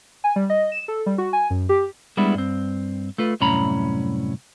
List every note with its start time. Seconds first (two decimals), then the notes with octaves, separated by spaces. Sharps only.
0.24 G#5
0.36 G3
0.50 D#5
0.72 E7
0.88 A4
1.06 G3
1.18 F#4
1.33 G#5
1.50 F#2
1.69 G4
2.17 G3 G#3 B3 D4 E4
2.34 G2 C4
3.18 A3 F4 B4
3.41 C2 F#2 A2 C#4 A#5 B5